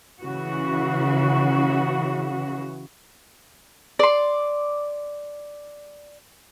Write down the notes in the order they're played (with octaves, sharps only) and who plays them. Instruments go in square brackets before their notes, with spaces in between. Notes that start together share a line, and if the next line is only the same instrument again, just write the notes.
[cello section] C#3 E3 F#4
[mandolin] D5 C6